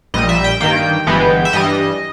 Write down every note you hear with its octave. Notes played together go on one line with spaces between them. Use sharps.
A#1 A#2 G3 D#5
E5
G5
G2 D#3 A#3 G5
G1 G2 E3 G#3 B3
E5
G2 E3 G3 D#5